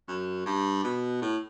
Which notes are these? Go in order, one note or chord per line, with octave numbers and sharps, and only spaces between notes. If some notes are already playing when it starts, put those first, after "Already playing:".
F#2
G2
B2
A2